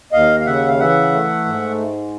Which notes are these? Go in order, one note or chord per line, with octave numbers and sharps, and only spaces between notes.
D#2 D#5 F5
F5
C#3 E5 F#5
F5
E3 E5 F#5
A3
G#2